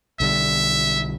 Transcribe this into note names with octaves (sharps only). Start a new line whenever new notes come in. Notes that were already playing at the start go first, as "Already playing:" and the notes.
B1 D3 G3 E5